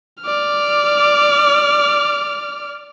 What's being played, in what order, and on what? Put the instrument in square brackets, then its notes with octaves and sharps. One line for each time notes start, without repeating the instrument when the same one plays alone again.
[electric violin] D5 F6